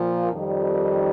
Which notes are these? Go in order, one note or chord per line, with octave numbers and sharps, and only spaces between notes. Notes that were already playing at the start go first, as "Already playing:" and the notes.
Already playing: A#2 F3
F2 D#3 G3